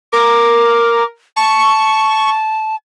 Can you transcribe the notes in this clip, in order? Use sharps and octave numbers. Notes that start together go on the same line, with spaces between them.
A#4 D6
A5 C#6